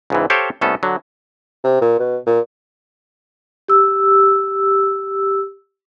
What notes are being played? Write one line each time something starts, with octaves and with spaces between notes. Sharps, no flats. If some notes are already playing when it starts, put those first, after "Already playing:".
C#2 G#2 E3
G4 A4 C5 C#5 F5 G5
C2 A3 B3 C#4 A4
D3 F#3
C3
A#2
B2
A#2
G4 E6